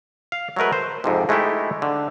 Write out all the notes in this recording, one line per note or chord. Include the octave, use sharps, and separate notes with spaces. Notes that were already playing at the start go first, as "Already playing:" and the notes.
F5
F#3 G#3 A3 A#4 B4
C5
F2 G#2 C3
G#3 A3 D#4 E4 G4
D3